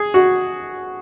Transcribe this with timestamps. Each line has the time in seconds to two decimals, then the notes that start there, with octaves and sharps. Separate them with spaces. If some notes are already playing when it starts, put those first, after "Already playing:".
Already playing: G#4
0.14 F#4